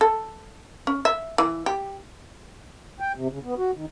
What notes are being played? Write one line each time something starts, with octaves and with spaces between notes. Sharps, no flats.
A4
C#4
E5
E3
G4
G5
C3
C#3
B3
F#4
D#3